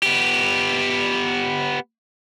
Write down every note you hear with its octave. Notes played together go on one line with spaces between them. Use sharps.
B3 G4